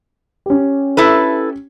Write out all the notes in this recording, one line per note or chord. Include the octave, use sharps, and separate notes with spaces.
C#4 G4
E4 A4 B4